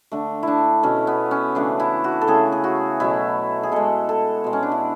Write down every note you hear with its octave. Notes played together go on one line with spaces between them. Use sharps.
D3 A3
D4 E4
B2 A3 C#4
B3
C#4
C#3 E3 A3 D4
E4
F#4
A4
C#3 E3 A3 G#4
G#4
F#4
B2 F#3 A3 E4
G#4
B2 G#3 A4
A4
B2 G#3
C#4
D4
E4